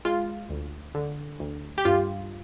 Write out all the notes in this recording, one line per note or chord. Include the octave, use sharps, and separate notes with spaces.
G#3 F4
D2
D3
D2
G4
G2 F4